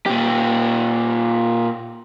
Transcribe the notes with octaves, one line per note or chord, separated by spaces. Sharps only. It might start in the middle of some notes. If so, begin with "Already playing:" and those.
A#2 G4